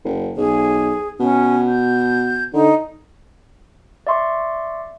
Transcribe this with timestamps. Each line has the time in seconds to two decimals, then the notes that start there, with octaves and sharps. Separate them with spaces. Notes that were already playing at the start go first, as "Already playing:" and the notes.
0.05 F#1
0.36 B1 G#4
1.20 B2 C#4
1.68 G6
2.53 D3 D#4
4.07 D5 E5 C6 C#6